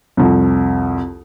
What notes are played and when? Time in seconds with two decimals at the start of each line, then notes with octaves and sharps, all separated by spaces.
0.17 C2 F2